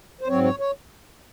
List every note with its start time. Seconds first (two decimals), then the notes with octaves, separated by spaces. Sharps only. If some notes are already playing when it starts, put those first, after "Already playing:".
0.21 C5
0.27 G#2 F#3 C4 C#5
0.44 C#5
0.59 C#5